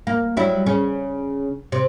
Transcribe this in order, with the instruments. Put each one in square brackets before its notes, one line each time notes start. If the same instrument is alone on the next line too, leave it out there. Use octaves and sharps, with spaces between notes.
[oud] A#3
F#3 G3 E4
C#3 C#4
C3